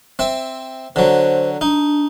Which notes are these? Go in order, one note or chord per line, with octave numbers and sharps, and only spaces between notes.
C4 E5
D3 F#3 C5
D4 D#4